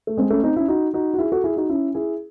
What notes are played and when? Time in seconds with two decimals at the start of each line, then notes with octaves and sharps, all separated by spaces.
0.07 A3
0.17 G#3 C4
0.30 A3 C#4
0.43 C4 D#4
0.56 C#4 E4
0.68 D#4 F#4
0.94 D#4 F#4
1.14 F#4
1.18 E4 G#4
1.32 F#4 A4
1.44 E4 G#4
1.56 D#4 F#4
1.70 C#4 E4
1.95 E4 G#4